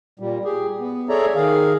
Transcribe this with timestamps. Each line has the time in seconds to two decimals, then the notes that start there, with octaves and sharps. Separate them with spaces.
0.19 A#2 G3
0.45 G4 G#4
0.80 B3
1.09 G#4 A4 C#5 D5 E5 A#5
1.35 D#3 G#4 F5